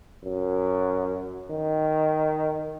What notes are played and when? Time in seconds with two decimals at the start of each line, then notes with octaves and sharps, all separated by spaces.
0.24 F#2
1.51 D#3